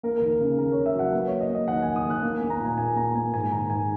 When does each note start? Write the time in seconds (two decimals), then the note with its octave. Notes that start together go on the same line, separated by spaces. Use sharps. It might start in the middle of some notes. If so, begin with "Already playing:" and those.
0.03 A#3 A#4
0.18 D#2 A#4
0.41 C#3
0.59 A#3 A#4
0.72 C#3 C#5
0.86 E5
0.94 F#3 F#5
1.13 A#3 B4
1.27 C#5
1.32 A#3
1.41 D#5
1.49 A#3
1.55 D#5
1.68 D#2 F#5
1.82 D#2 G#5
1.96 D#6
2.04 D#2
2.10 F#6
2.23 A#3
2.37 A#3 G#5
2.50 A#5
2.60 A#2 G#5
2.77 A#3 G#5
2.96 A#3 A#5
3.15 A#3 G#5
3.33 G#2 G#5
3.43 G#5
3.52 D#3 A#5
3.69 G#2 G#5